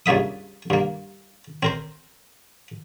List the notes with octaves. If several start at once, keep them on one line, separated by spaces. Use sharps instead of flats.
C#2 G2 A#3 E5 D#6
G2 A#3
C4 A#4 C5